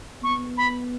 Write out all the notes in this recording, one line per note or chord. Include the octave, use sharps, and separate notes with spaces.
B3 C#6
B5